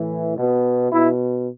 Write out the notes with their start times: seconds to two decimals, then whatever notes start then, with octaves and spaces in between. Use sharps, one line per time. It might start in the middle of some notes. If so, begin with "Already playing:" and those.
Already playing: A2 E3
0.37 B2
0.92 B2 E4